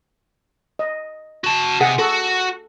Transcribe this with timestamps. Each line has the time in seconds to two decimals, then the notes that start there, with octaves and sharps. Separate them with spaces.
0.79 D#5
1.44 F#4 A5
1.81 C3 G#4 F#5
1.99 F#4 A4